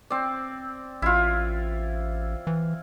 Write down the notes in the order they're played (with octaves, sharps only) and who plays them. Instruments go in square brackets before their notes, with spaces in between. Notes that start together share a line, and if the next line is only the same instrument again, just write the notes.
[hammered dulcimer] C4 D5
[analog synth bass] A1 [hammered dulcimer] E4 F4
[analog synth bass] E3